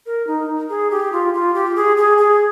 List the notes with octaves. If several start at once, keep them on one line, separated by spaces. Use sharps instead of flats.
A#4
D#4
G#4
G4
F4
F4
G4
G#4
G#4
G#4